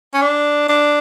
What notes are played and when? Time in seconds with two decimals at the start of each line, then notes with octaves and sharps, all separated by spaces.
0.14 C#4
0.22 D4
0.69 D4